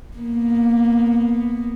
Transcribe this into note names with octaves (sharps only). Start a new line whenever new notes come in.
A#3 B3